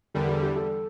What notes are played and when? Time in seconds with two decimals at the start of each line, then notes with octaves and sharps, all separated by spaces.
0.14 E2 D3 G3 A#4
0.29 A4
0.42 G4
0.56 A4